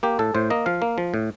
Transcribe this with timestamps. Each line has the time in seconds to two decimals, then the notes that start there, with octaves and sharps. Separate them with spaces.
0.03 A#3 G4
0.19 A2 A4
0.35 A2 C5
0.50 A#3 D#5
0.66 F3 F5
0.82 A#3
0.98 F3
1.14 A2